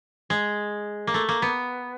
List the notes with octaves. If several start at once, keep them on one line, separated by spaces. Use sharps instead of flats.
G#3
A#3
A3
A#3
B3